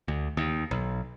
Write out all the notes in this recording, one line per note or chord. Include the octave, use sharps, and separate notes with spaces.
D2
D#2
B1